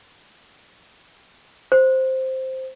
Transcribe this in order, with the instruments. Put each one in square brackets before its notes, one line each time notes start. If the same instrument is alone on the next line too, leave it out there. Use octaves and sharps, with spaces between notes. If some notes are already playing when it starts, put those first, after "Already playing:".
[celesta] C5